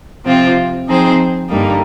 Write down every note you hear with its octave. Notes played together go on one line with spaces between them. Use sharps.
C3 F3 C4 F4
F3 C4 D#4 G#4 C5
G2 D3 G3 A#3 D#4